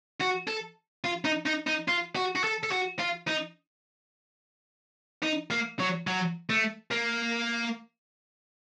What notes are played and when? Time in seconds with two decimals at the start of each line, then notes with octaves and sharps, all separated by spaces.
0.20 F#4
0.47 A4
1.04 F4
1.25 D#4
1.46 D#4
1.67 D#4
1.88 F4
2.16 F#4
2.36 F#4
2.44 A4
2.63 A4
2.71 F#4
2.99 F4
3.27 D#4
5.23 D#4
5.51 A#3
5.80 F#3
6.07 F#3
6.50 A3
6.91 A#3